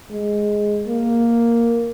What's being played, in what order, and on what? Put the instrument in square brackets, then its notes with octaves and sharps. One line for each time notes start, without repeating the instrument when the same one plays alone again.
[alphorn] G#3
A#3